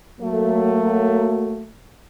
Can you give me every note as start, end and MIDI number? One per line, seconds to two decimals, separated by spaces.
0.21 1.67 54
0.21 1.67 57
0.21 1.67 58